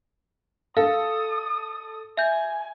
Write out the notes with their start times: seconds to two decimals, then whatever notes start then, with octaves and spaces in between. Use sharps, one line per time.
0.77 A4 F5 D#6
2.17 E5 G#5 G6